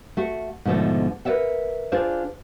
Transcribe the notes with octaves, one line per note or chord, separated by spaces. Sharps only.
A3 F#4
G#2 B2 D3 F3 A3
A#4 B4 C#5 D5 E5 F#5
D4 F4 G#4 C5 D5